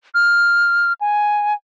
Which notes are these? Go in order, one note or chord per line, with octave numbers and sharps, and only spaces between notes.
F6
G#5